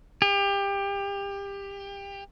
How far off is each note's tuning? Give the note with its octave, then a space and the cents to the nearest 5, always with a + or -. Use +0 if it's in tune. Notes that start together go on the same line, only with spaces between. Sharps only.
G4 +25